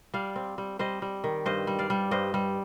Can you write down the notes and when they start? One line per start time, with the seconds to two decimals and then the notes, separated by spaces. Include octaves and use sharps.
0.14 G3 D5 F5
0.36 C4
0.58 G3
0.79 G3 C5 D#5
1.02 G3
1.24 D#3
1.46 G2 C5 D#5
1.67 G3
1.79 D5 F5
1.90 G3
2.11 G2 C5 D#5
2.34 G3